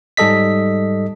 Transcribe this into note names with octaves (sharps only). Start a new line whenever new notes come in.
G#2 G3 A4 D#5 B6